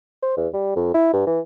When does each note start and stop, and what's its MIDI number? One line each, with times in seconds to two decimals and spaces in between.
0.22 0.34 72
0.37 0.48 40
0.53 0.71 55
0.76 0.93 41
0.94 1.08 64
1.13 1.23 43
1.26 1.40 52